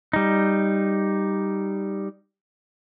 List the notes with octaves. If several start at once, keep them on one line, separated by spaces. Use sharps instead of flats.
G3 D#4